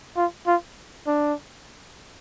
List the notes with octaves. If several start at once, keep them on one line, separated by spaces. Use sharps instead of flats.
F4
F4
D4